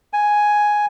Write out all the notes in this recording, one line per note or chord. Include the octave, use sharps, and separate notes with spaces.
G#5